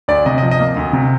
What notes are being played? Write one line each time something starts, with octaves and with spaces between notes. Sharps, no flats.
D2 D5
C3 D#5
D#5
F3
D#5
A#3
D2
C3